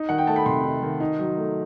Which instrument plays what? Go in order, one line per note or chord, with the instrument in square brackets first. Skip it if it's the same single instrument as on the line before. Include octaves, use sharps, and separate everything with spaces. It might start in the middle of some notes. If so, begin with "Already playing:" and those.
Already playing: [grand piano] D#4
D#3 F#5
G5
A3 A5
B5
C3 C6
D#4
D#3
D#4
F#3
A3